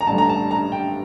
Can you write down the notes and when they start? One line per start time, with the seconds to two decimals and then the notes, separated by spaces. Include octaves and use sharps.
0.01 A#5
0.07 A1 G2 D3 A5
0.18 A#5
0.29 A5
0.51 A#5
0.72 G5